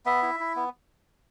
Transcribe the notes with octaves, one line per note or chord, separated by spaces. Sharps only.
B3 E5
E4
E4
B3